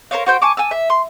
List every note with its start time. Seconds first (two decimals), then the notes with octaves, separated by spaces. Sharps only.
0.11 A#4 C5 C#5 F5
0.26 F#4 C5 G5
0.42 G#5 A5 C#6 D6
0.57 G#5 A5 E6
0.71 E5
0.90 C6